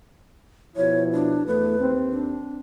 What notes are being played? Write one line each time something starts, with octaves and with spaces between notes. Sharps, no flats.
B2 F3 E4 C#5
D4
E2 A3 B4
D#2 C4
D4